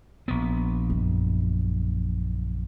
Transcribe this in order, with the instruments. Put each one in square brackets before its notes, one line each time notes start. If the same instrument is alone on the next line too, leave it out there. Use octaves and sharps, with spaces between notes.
[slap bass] A#1 B3
[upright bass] F#2